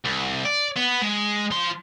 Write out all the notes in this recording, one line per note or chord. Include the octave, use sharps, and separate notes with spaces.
C2
D5
B3
G#3
F3 C6